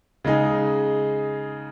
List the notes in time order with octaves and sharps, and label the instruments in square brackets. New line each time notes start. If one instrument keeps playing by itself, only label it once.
[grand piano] C#3 G#3 D#4 G#4